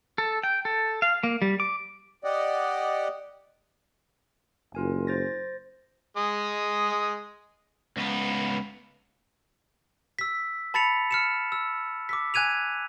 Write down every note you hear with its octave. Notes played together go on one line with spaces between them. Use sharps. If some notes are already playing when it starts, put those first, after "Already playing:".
A4
G5
A4
F5
A#3
G3
D6
G4 D5 D#5 F#5
F#1 F4 A#4 G#5
C5 A6 A#6
G#3 D#6
C#2 B3
E6 B6
A5 B5 A6 B6 C#7 F7
F6 C#7 E7
E6
D6 E6 B6
G#5 F#6 G#6 D#7 F7